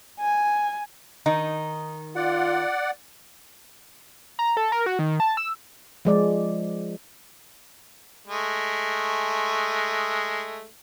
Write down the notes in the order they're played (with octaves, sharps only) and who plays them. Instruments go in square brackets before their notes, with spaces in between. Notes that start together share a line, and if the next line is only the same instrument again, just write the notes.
[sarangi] G#5
[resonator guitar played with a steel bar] D#3 D#4
[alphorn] F4 [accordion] D5 F#5
[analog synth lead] A#5
A4
A#4
F#4
D#3
A5
E6
[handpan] F3 G#3 D5
[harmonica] G#3 A3